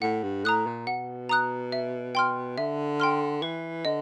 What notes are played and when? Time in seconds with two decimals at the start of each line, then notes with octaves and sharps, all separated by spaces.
0.02 A2 F#5
0.23 G2
0.45 A2 A#5 D#6 F#6
0.66 A#2
0.87 B2 F#5
1.29 A#5 D#6 F#6
1.72 E5
2.15 G5 C6 F6
2.58 D3 E5
3.00 G5 C6 F6
3.42 E3 B4
3.85 D3 D#5